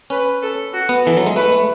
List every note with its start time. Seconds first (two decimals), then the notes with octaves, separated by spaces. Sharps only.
0.10 C#4 B4
0.42 A4
0.74 F#4
0.89 B3
1.05 E3 A4
1.17 F#3
1.26 G#3
1.36 A3 B4
1.52 A3